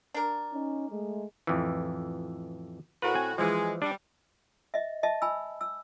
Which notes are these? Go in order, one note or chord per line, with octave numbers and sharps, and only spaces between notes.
D4 A#4
C#4 D#4
G#3 A3
A1 F2 E3
A2 F#4 A#4 B4
C4 G#5
E3 F3 G#3
G3 D4
D#5 E5
D#5 E5 A5
G#5 B5 E6
E6